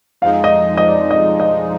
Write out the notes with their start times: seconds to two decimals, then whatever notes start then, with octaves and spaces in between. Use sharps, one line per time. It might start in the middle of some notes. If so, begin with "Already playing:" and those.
0.22 F2 F3 G#3 D#4 F5
0.44 D#5
0.77 D#5
0.88 D5
1.11 D#5
1.40 D#5